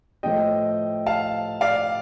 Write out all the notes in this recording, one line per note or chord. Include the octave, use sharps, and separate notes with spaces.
A2 F3 A3 D#5 G5
F5 A5
D5 F5